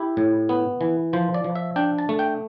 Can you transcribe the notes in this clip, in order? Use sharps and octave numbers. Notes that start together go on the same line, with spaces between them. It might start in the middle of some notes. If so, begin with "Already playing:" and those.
Already playing: E4 G4
A2
B3
E3
F3 C5
D5
F3
E5
D4 G5
A5
A3
G5